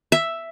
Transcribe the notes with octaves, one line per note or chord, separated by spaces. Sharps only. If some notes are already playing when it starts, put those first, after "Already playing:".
E5